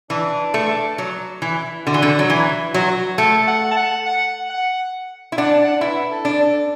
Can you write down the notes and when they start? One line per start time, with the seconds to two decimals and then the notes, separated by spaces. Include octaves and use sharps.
0.10 E3 D4
0.54 A3
0.98 F#3
1.42 E3 E4
1.86 D3 F#4
1.94 E3
2.02 D3
2.19 F#3
2.30 E3 E4
2.74 F#3 F#4
3.18 A3 A4
3.47 F#5
3.71 A5
3.76 F#5
4.06 F#5
4.50 F#5
5.32 E4
5.38 D4 F#5
5.51 A5
5.64 F#5
5.81 E4 B4
6.10 A4
6.25 D4
6.40 A4